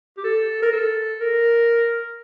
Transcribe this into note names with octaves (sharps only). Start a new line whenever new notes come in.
G4
A4
A#4
A4
A#4